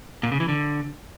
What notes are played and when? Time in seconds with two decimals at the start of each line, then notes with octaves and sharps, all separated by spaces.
0.23 A#2
0.32 C#3
0.40 E3
0.48 D3